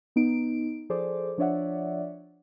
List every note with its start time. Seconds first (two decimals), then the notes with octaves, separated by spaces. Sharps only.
0.16 B3 D#4 D7
0.90 F3 G#4 A4 C5 D5 D6
1.38 F3 D4 C#5 D5 E5 F#5